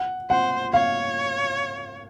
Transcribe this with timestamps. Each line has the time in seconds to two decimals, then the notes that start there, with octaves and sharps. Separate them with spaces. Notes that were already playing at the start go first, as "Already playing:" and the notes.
Already playing: F#5
0.30 C5 F#5
0.73 C#5 F5